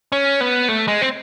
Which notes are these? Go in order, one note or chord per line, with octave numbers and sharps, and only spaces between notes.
C#4
B3
A3
G#3
C4